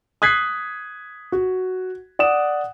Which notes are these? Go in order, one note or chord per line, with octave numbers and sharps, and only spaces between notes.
D#6 F#6 G#6 B6 C7
F#4
D5 F#5 D#6 E7